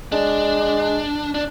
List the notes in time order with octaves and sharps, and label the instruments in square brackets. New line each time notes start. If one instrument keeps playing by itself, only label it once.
[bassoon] G#3 [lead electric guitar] D4
[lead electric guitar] D4